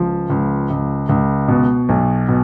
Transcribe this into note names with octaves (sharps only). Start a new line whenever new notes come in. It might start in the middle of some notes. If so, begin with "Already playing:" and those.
Already playing: C#2 F3
C#2
C#2
C#2
B2
B1
B2